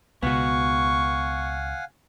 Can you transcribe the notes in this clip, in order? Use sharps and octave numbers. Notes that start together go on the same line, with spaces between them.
C#2 B2 B3 F#4 F5 F#5 G#5 C#6